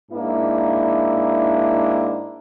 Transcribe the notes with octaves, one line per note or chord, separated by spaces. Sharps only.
G#2 A#3 D4 E4